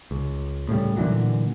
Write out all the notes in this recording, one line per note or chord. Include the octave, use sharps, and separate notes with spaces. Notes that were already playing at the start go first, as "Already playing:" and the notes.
C#2
A2 C#3 F3 G3
A#2 D3 E3 F#3